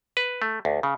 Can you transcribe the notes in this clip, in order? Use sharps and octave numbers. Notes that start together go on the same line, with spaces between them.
B4
A3
D2
C#3